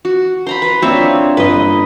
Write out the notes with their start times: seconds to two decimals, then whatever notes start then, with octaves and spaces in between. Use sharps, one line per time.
0.05 F#4
0.47 C5 A#5 B5
0.62 B4
0.82 A#3 C4 D4 F4 C#5 E5
1.37 G1 B4 D#5